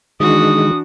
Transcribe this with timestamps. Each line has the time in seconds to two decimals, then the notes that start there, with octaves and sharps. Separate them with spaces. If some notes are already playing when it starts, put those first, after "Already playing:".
0.20 D#3 E3 G#3 D4 F#4 D#6